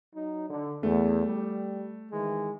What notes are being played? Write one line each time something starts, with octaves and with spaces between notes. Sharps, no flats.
F#3 D#4
D3
E2 A3
G3
D#3 E3 G#3